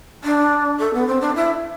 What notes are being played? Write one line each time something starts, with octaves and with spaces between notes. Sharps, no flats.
D4
A4
B3
C4
D4
E4